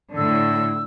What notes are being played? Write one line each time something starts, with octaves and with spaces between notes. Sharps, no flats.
A2 D3 E6